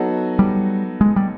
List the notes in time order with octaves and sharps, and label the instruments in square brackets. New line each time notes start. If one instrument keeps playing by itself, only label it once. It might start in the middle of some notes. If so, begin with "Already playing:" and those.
Already playing: [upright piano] F#3 B3 D#4 F#4 A4
[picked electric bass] G3
G#3
G3